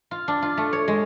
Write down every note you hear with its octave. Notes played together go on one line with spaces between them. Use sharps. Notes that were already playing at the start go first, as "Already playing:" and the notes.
F4
D4
F4
A3
C#5
G#3